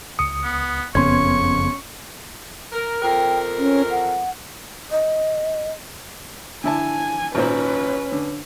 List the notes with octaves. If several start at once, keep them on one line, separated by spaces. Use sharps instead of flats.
C#2 D#6 C#7
B3
F#1 F2 C#3 B3 C#4 C6 C#6 G#6
A#4
F2 A#4 G5
C#4
F#5
D#5
D3 E4 G#5 A5
G#1 A#2 C#4 B4 C5
D3